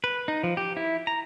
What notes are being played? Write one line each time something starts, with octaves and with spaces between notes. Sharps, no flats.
B4
D#4
F3
G4
E4
A#5